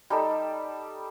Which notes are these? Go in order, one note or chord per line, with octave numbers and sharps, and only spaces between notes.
G3 D#4 A4 B5